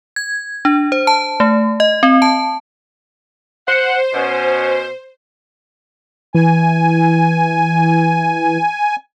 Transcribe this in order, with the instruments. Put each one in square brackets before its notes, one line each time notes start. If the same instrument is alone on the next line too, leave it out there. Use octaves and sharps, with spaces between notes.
[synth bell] G#6
D4
C5
A5
A3
D#5
C4
A5
[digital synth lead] C5 [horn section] F#5
[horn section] B2 C#4
[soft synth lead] E3 [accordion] G#5